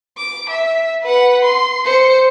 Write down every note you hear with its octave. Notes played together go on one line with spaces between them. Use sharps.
D6
E5
B4 F#5
C6
C5 C#7